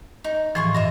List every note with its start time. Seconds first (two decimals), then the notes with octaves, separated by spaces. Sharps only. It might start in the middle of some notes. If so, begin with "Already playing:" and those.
0.24 D#4
0.55 A2 E3 F3 G#4 C6 C#6
0.74 G2 F4 D#5 E5